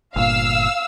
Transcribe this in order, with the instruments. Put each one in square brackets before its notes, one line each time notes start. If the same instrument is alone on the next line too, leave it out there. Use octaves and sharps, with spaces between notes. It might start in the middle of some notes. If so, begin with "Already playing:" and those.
[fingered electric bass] G1 A#2 [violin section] F5 E6